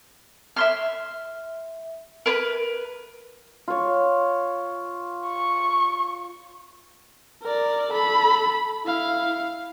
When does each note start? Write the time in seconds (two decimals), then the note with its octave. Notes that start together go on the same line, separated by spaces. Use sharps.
0.56 E5 C6 F6
2.26 A#4 B4
3.68 F4 C#5
5.27 C#6
7.42 A#4 D5
7.92 A4 B5
8.85 E4 F5